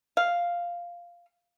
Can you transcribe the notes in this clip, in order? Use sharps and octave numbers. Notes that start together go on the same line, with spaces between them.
F5